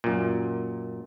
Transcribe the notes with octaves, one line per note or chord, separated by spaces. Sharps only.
F#2 A#2